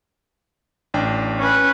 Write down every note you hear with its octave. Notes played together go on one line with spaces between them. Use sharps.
A1 D4 G5
C#4 B4